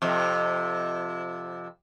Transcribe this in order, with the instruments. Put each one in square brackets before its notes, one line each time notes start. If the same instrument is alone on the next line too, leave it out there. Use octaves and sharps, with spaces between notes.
[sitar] F2 C3